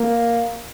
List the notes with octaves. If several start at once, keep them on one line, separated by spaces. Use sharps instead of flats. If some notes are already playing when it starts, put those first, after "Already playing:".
Already playing: A#3